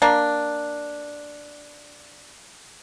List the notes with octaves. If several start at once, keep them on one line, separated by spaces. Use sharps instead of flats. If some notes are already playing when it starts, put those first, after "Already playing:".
A#3 D4